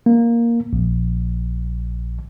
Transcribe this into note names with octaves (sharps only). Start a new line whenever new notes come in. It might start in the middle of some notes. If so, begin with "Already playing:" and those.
A#3
A#1